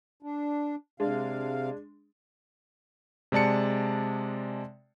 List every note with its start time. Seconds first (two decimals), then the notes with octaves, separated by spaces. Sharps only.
0.23 D4
1.00 C3 G#3 D4 F5
3.32 C3 G#3 D5 A5 C#7